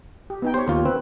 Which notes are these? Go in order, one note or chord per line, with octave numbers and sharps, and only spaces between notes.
G4
B3 D#4 G5
G4 C5 C#5
D#2 F4
C4 B4